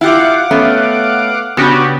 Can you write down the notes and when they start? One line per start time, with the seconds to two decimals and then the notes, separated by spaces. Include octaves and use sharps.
0.01 E4 F4 G4 F5 F#5 D6
0.51 A3 B3 C#4
1.57 C#3 B3 D4 F#4 G4